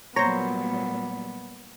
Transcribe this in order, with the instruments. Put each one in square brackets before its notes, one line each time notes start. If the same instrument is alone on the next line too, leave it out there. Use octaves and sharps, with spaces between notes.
[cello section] A#2 F#3 G3 [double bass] B3 [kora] C5 C#5 [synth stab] A#5